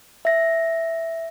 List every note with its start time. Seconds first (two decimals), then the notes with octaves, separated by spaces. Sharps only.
0.25 E5 A#6